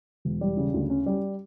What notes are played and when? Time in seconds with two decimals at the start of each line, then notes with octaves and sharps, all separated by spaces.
0.25 E1
0.41 G3
0.57 C#3
0.74 D2
0.90 C#4
1.06 G3